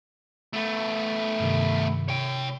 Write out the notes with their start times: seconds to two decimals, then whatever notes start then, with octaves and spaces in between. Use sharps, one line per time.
0.53 A3 B3
1.40 G2 C3 D#3
2.08 C3 C#5 G5